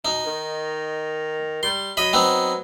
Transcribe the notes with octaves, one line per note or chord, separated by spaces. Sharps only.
B2 D#4
D#3
G3 C6
F#3 D#5 B5
B3 C4 D#4